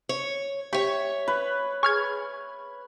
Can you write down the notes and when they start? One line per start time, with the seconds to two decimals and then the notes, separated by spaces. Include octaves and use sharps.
0.09 C#5
0.73 G4 C#5 E5 C#6
1.28 B4
1.83 G#4 C#6 F6 G#6